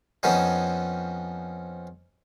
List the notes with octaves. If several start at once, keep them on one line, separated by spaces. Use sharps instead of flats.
F2 F3 B3 C#4 D#4